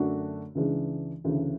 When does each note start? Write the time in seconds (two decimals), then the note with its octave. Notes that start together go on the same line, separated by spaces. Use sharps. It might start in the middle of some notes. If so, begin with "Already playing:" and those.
Already playing: F#2 D3 A3 D4 F#4
0.55 C#2 C#3 E3 G#3 D4
1.24 D2 C#3 E3